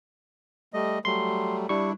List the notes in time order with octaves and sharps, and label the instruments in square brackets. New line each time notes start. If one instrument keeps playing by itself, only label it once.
[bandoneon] G3 A3 D#5
[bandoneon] F#3 G3 A3 [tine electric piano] C6
[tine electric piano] G3 C#6 [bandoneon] D4 E4